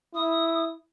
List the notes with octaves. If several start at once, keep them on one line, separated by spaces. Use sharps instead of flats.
E4 D#6